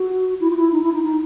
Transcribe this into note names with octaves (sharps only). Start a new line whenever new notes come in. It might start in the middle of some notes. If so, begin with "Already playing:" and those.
Already playing: F#4
E4
F4
E4
D#4
E4
D#4
D#4